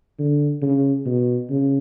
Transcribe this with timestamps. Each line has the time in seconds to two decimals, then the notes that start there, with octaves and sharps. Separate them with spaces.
0.19 D3
0.62 C#3
1.06 B2
1.50 C#3